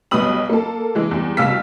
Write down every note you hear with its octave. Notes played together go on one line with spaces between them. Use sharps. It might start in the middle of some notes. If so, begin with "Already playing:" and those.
B1 G3 B3 B5 D#6 F#7
A#3 A4
E3 G#3
E2 G3
C2 B2 F5 E6 F6 B6